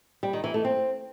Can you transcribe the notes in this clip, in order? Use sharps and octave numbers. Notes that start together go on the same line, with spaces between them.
G3
D#3
E3
A3
C4